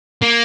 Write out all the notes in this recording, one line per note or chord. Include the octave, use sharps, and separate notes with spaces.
A#3